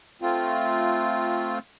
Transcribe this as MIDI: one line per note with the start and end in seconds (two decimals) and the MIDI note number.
0.22 1.59 57
0.22 1.59 60
0.22 1.59 65